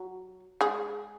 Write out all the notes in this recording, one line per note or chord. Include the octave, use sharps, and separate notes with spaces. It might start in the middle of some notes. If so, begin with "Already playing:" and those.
Already playing: F#3
G#3 G#4